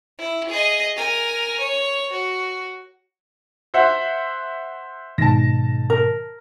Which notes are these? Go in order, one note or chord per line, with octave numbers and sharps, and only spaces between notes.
E4
G#4 D#5
A#4 G#5
C#5
F#4
C5 E5 F#5
G#2 B2 D#3 A5 A#6
A#4